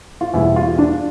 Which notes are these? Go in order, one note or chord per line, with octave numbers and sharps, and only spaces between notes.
F4
E2 B2 G3 E4
F4
D4